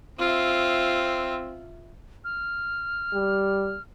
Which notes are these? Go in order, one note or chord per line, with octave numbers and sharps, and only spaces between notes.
C4 F4 E5
F6
G3